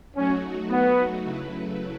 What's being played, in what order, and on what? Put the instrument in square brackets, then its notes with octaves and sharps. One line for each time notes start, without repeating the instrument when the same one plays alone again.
[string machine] F#3 A3 D#4 F#4 [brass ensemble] C#4
[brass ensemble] B3
[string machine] C#3 F#3 A3 E4 B4